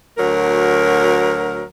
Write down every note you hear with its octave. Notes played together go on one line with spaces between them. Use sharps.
D2 F#3 A#4